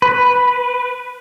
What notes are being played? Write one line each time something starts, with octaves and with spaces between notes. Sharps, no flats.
B4